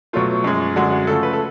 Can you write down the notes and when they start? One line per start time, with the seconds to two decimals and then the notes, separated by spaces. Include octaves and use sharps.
0.13 B2 F#3 A3 F4
0.44 F#2 F3 G#3
0.76 F#2 D3 G#3 F#4
0.91 F#4
1.07 C#3 F3 A3 A4
1.23 B4
1.33 A4